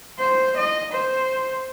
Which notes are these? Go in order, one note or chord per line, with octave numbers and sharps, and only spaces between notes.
C5
D#5
C5